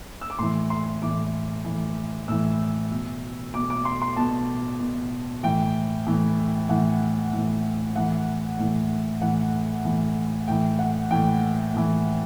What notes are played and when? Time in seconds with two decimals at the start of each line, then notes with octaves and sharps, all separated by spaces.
0.21 E6
0.30 D6
0.39 A2 E3 C6
0.70 C6
1.02 A2 E3 D6
1.65 A2 E3
2.28 A2 E3 E6
2.91 B2
3.54 B2 D6
3.70 D6
3.85 C6
4.02 C6
4.16 B2 A5
4.80 B2
5.43 A2 E3 G5
6.07 A2 E3
6.69 A2 E3 F#5
7.33 A2 E3
7.95 A2 E3 F#5
8.59 A2 E3
9.22 A2 E3 F#5
9.85 A2 E3
10.48 A2 E3 G5
10.79 F#5
11.11 A2 E3 G5
11.74 A2 E3